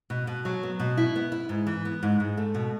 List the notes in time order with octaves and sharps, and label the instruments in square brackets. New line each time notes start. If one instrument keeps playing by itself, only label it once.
[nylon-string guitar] B2
B2
F#3
B3
B2
E4
B3
E4
G#2
E3
B3
G#2
G#2
A3
B2